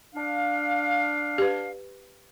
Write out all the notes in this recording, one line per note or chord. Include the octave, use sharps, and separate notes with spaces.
D4 F5
G4 B4